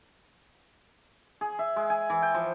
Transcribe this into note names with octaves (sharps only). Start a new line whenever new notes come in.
G#4
E5
G#3
G#5
E3
G5
F3